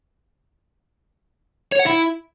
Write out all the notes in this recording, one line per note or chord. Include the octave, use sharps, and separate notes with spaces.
C#5
F#5
E4